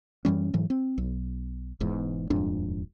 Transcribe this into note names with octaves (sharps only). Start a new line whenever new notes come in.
F#2 E3 G3 C#4
G#2 E3 F#3
C4
B1
E1 E2 G#2
D#1 F2 G#2 D4